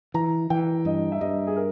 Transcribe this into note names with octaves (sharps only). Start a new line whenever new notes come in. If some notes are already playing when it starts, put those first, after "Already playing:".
E3 A#5
E3 G5
G2 D#5
E5
G2 D#5
G#4
A#4